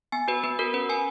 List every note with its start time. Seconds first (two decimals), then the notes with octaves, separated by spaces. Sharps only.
0.12 B3 G#5
0.28 F#4 B4
0.43 B3 B4
0.59 F#4 A#4
0.74 C#4 B4
0.89 F#4 G#5